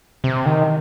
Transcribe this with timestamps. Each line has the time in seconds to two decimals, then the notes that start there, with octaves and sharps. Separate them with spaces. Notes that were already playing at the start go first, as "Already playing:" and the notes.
0.24 C3
0.46 D#3